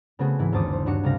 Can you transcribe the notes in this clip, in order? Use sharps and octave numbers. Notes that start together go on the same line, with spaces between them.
C#3 A3 B3 C4 F#4 G#4
G#2 E3 E4
G1 D#2 C5 A5 D6 D#6
C5
G2 D4 F#4 C#5 C#7
C#2 C3 G3 A3 F5 A#6